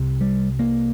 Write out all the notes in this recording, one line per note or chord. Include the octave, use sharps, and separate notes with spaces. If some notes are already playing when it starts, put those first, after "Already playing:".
Already playing: C2 C3
G3
A#3